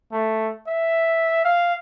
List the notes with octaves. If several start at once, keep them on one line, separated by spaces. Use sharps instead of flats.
A3
E5
F5